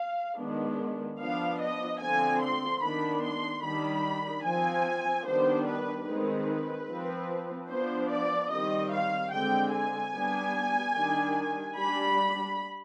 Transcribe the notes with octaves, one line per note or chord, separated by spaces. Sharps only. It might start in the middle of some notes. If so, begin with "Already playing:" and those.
Already playing: F5
D#3 G#3 B3 D4
F3 B3 D4 F5
D#5
D3 F3 C4 G#5
C6
D#3 B3 D4 B5
C6
D#3 G3 D4 B5
F3 C4 G#5
D#3 G3 B3 D4 C5
B4
D#3 G#3 C4 B4
F3 C4
F3 B3 D4 C5
D5
D#3 G3 C4 D#5
F5
D3 G#3 C4 G5
G#5
G3 B3 D4
D#3 G3 D4
G3 D4 B5